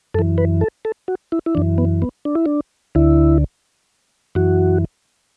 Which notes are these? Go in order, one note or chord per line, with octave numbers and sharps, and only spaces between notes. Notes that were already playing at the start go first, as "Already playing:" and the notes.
F#2 E3 A4
B4
A4
A4
F#4
E4
E4
F#2 E3 D4
B3
B3
D4
E4
D4
D2 D3 E4
F#2 E3 F#4